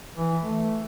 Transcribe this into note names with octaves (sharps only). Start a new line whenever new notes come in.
E3
A3